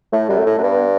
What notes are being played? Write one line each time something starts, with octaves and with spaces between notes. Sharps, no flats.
A2 A3
F#2 G3
A3
A2
F#2
G2 B3